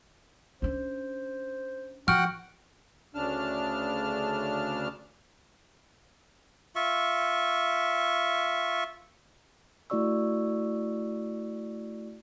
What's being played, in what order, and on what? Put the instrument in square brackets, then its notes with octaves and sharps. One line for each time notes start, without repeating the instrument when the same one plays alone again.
[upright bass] C#4 D4 [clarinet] C5
[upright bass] F3 [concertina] F#4 F#5 G5 [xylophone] F6
[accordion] D2 C#3 D4 A5 F6
[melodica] F4 E5 C#6
[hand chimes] A3 E4 F#4 D5 C#6 E6